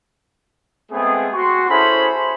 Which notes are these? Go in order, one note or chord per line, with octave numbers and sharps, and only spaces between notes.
G#3 A3 B3 C4 G#4
F#4 C6 C#6
C#4 E4 G#4 A4 C5 B5